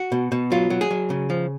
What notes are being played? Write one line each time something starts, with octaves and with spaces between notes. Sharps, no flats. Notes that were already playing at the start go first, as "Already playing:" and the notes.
Already playing: F#4
B2
B2
F#3 F4
F#3
G#4
F#3
C#3
F3